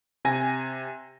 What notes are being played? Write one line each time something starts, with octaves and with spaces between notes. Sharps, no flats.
C3 G#5 A#6